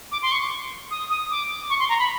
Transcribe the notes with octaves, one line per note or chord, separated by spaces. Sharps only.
D6
C6
C#6
D#6
D#6
D6
C#6
C6
A#5
B5